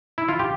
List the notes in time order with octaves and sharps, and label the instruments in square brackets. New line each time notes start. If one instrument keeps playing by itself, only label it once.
[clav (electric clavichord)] E4
F4
G4